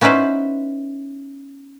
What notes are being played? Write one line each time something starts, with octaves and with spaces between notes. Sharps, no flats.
B3 C#4 D#4 E4 B4 C5